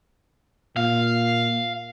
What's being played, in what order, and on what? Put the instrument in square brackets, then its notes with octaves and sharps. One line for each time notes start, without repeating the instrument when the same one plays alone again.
[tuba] A#2 [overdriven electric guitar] F5